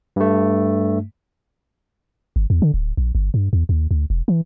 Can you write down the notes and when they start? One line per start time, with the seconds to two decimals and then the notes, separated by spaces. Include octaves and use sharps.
0.16 G2 A3
2.36 G1
2.50 E2
2.62 D3
2.74 D1
2.97 A#1
3.15 G1
3.34 G2
3.53 E2
3.69 D#2
3.91 D2
4.10 E1
4.28 E3